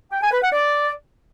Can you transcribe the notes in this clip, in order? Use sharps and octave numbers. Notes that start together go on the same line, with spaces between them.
G5
G#5
B4
F#5
D5